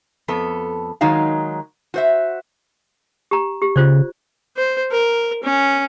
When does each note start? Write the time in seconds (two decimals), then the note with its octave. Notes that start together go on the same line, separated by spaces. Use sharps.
0.28 F2 B3 A4
1.01 D#3 F#3 G#3 D#4 F5
1.94 F#4 C5 E5
3.31 G4 A#5
3.62 G4
3.76 C#3 F4 C5 D5
4.56 C5
4.91 A#4
5.43 C#4